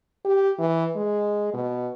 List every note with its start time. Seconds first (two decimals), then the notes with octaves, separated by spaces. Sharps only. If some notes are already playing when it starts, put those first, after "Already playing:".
0.25 G4
0.59 E3
0.96 G#3
1.54 B2